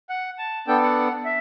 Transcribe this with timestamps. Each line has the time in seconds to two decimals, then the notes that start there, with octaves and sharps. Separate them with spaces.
0.10 F#5
0.39 A5
0.68 B3 D4 A4 G5
0.82 F#5
1.25 E5